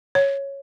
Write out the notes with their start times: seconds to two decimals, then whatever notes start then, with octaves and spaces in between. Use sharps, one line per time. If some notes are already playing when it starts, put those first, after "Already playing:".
0.15 C#5